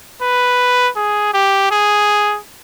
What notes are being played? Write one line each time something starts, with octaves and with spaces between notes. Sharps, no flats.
B4
G#4
G4
G#4